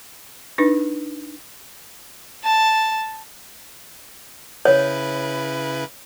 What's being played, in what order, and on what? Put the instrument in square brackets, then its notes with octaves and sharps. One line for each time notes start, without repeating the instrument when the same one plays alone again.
[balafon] D4 D#4 B4
[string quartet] A5
[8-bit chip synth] C#3 E4 B4 [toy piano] C#5